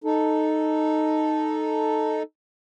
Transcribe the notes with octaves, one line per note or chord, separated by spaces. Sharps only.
D#4 A4